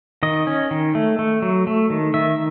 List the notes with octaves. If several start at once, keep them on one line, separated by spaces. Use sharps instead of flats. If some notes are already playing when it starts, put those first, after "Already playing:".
D#3 D#5
C#4
D#3
A3
A3
F#3
A3
D#3
D#3 E5